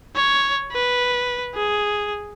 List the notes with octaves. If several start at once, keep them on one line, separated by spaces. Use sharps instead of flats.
C#5
B4
G#4